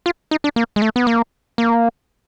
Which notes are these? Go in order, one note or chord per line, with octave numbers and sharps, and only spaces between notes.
F4
D#4
D4
A#3
G#3
A3
B3
A#3
A#3